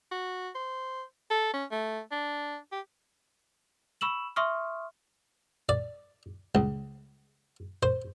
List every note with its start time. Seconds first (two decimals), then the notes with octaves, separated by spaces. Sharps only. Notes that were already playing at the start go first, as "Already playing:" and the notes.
0.12 F#4
0.55 C5
1.31 A4
1.54 C#4
1.71 A3
2.11 D4
2.72 G4
4.01 B5 C#6 E6 E7 F#7
4.36 E5 C6 C#6 D#6 F6
5.69 D5
6.55 C#2
7.83 C5